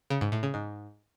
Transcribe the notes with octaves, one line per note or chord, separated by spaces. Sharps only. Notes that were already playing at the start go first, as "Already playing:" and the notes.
C#3
G#2
A2
C#3
G#2